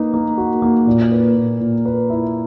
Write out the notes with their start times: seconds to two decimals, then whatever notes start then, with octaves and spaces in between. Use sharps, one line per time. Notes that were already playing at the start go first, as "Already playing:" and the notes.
Already playing: A#3 D#4 B4
0.13 A#3
0.37 F#4
0.62 A#3
0.87 A#2
1.12 B4
1.36 A#2
1.60 A#2
1.85 B4
2.10 E4